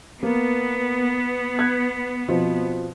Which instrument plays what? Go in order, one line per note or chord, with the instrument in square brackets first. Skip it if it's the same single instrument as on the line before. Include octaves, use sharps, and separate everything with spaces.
[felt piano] A#3 [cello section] B3
[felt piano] F#6 G#6
B2 F3 C4